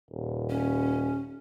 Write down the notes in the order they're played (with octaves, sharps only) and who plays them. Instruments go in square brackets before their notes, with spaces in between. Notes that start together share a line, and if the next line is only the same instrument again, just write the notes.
[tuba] D#1
[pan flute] C#4